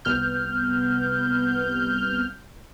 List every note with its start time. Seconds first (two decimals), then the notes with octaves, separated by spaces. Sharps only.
0.05 C2 B3 F6 G6